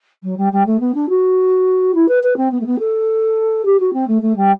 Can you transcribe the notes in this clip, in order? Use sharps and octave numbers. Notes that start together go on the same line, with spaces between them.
F#3
G3
G3
A3
B3
D4
F#4
E4
B4
B4
C4
B3
A3
B3
A4
G4
F#4
C4
A3
A3
G3